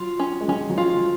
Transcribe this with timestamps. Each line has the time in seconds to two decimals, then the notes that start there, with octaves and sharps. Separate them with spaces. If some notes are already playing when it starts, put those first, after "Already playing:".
Already playing: F#3 F4
0.20 C#4
0.41 G#3
0.48 F#3 C#4
0.70 F#3
0.77 F3 F4
0.97 F3